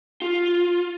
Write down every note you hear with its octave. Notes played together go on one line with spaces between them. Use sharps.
F4